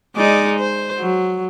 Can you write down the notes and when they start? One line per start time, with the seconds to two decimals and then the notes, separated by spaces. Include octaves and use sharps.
0.16 G#3 D#4 D5
0.59 C5
0.99 F#3